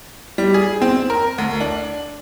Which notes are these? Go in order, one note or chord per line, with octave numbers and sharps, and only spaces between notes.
G3
G#4
C4
A#4
D2
D4